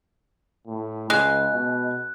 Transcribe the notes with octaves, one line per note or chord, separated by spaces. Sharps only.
A2
C#2 G#3 F#6
B2